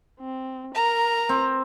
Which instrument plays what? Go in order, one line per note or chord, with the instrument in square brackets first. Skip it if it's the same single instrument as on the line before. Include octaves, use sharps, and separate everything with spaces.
[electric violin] C4
[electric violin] A#4 [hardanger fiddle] A#5
[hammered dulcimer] C4